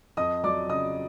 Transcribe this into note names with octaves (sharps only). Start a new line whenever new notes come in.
F2 D#5 D#6
F#3 D5 D6
C#3 D#5 D#6